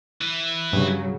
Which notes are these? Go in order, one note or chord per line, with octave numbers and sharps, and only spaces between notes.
E3
G2 C#3 F#3